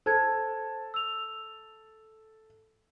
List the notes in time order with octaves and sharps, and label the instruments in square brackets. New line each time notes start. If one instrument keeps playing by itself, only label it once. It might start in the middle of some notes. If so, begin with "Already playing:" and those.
[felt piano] A4 [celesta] C5 A5 G#6
[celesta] E6 F7